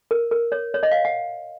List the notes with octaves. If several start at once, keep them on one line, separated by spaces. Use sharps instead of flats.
A#4
A#4
C#5
C#5
D#5
F5
F#5